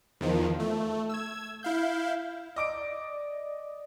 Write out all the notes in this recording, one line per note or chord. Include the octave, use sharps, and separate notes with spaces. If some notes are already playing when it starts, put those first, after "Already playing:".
E2 D#3 F3
A3
E6 G#6
E4 F5 G6
D5 D#5 D6 D7